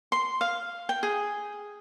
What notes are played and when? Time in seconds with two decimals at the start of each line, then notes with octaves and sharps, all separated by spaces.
0.12 C6
0.41 F5
0.89 G5
1.03 G#4